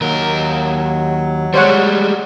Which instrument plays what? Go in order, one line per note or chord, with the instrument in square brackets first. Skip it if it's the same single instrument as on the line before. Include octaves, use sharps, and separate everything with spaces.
[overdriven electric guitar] D#2 A#4 [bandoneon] F#3
[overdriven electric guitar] G3 G#3 [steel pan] C5 C#5 F#5